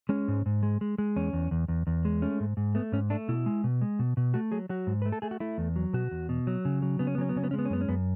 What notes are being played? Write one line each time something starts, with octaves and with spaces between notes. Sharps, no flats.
G#3 C#4
G#2
G#2
G#3
G#3
G#3
E2 C#4
E2
E2
E2
E2
G#3
A3 C#4
G#2
G#2
A3 B3
G#2 C#4
A3 D4
B2 E4
G#3
B2
G#3
B2
B2
A3 F#4
F#3 G#4
F#3 F#4
G#2
A3 B4
A4
A3 G#4
F#4
A3 E4
E2
F#3
B2 F#4
E2
B2
F#3
C#3
F#3
C#3 B3
C#4
B3
F#3 C#4
B3
C#3 C#4
B3
G#3 C#4
B3
C#4
F#2 B3
C#4
F#2 B3